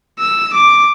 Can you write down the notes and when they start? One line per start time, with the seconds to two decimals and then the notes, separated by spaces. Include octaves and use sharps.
0.19 E6
0.53 D6